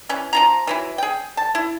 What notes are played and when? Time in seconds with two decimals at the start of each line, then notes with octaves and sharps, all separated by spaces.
0.09 E3 C#4
0.33 F3 F4 A#5
0.67 E3 F#3 E4
0.98 G#4 G5
1.37 A5
1.55 E4